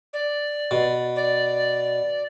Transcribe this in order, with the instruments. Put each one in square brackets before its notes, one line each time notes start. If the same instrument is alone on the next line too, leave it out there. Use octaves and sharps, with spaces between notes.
[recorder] D5
[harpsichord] B2
[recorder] D5